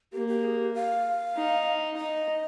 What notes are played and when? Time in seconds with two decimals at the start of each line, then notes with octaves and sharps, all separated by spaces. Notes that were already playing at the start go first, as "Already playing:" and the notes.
0.12 A#3 G4
0.28 G4
0.44 G#4
0.58 G4
0.74 F5
1.36 D#4
1.97 D#4 D#5